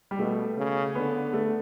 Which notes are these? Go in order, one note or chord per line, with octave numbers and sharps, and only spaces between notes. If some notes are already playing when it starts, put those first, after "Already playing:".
G3
B2 A3
C#3
D3 B3
A3